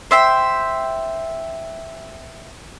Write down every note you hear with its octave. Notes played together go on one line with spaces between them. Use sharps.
C5 E5 G5